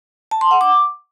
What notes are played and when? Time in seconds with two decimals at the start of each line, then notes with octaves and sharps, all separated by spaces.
0.31 A5
0.41 C6
0.51 F#5
0.61 D6